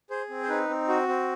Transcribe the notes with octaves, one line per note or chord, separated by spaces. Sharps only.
G#4 C5
C4
C5
D#4 B4
C4
F#4
C4